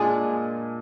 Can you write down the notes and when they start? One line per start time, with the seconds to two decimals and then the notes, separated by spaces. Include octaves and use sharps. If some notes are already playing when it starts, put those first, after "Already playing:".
Already playing: A#2 G#3 D4 G#4